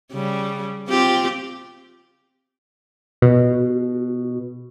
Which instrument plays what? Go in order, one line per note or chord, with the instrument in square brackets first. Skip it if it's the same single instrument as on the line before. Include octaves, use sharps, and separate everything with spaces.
[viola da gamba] C#3 G3
C4 F4 G4
[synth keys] B2